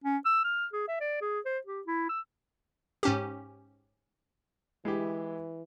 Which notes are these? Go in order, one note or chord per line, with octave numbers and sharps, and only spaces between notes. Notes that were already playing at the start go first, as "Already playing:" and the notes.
C#4
E6
F6
G#4
E5
D5
G#4
C5
G4
E4
E6
G#2 C#4 G4
E3 G#3 E4 G4